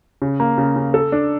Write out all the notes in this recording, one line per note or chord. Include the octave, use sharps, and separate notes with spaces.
C#3
A#3
C#3
C#3
A4
D4